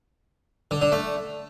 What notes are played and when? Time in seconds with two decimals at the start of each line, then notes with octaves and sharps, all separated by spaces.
0.71 D3
0.82 D3
0.92 A3